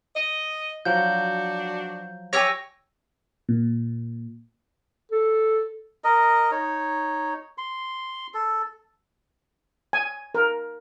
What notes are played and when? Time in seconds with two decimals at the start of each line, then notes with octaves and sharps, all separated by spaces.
0.14 D#5
0.85 F3 F#3 D4 F#4 G6
2.33 G4 C#5 G#5 E6 A#6
3.49 A#2
5.11 A4
6.04 A#4 D#5
6.51 D#4 C#5
7.58 C6
8.34 A4
9.93 G#5
10.35 A#4